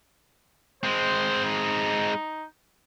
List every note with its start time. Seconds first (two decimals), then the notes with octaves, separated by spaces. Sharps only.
0.83 G#3 C4 C5
1.45 D#4